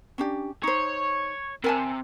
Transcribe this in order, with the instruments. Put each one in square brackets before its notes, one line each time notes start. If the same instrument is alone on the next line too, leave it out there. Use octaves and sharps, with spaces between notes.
[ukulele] C#4 D4 G4
[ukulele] D#4 C5 [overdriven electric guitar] C#5
[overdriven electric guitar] C3 [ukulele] A#4 G#5 A5